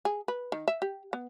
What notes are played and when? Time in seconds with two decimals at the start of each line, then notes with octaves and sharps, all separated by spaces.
0.05 G#4
0.28 B4
0.52 D#3
0.68 E5
0.82 G4
1.13 B3